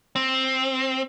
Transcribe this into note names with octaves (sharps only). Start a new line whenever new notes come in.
C4